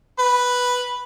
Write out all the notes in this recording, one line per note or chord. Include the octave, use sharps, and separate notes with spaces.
B4